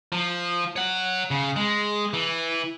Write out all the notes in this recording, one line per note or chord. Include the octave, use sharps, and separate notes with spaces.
F3
C#5 F#5
C#3
G#3
E3